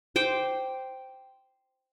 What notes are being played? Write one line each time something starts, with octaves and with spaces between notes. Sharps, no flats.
C5 G5 D6